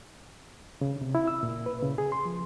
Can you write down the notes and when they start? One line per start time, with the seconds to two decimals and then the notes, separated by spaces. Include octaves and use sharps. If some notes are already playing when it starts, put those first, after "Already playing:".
0.81 C#3
1.01 C3
1.15 E4
1.27 E6
1.43 A#2
1.66 B4
1.83 C#3
1.98 G#4
2.12 C6
2.26 F3